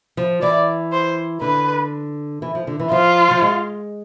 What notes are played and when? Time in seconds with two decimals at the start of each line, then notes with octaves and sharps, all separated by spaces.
0.17 F3
0.42 E3 D5
0.92 C5
1.42 D3 B4
2.42 E3
2.55 F3
2.67 D3
2.79 E3
2.92 F3 F4
3.31 F3
3.42 G#3